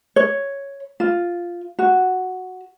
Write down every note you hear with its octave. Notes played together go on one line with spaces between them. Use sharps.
C#5
F4
F#4